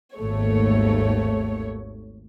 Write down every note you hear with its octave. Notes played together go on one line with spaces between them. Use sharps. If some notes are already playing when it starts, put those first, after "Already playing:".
G#1 D#2 A3 C#5